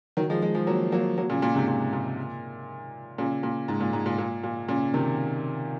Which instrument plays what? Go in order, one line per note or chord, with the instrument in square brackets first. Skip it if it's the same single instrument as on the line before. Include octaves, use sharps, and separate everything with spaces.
[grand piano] D#3 F#3
F3 G#3
F3 G#3
F3 G#3
F#3 A#3
F#3 A#3
F#3 A#3
A#2 C#3
A#2
G#2 C3
A#2
A#2
A#2 C#3
A#2
G#2
A#2
G#2
A#2
A#2
A#2
A#2 C#3
C3 D#3